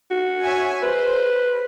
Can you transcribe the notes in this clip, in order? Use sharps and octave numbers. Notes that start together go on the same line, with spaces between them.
F#4
C#5 E5 G#5
B4 C5